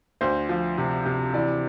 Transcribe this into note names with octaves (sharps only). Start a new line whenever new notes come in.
D2 C5
F3
C3
C3
E3 D5